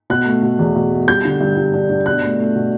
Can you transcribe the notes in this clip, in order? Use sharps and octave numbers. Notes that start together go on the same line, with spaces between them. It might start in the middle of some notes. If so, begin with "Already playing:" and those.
B2 F#6
A3
B2
E2
B2
A3
G3 G6
D3
G2
G3
D4
D4
B2 F#6
A3
A3
B2